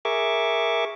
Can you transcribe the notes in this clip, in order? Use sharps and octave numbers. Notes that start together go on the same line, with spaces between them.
G#4 A#4 E5 C#6 D6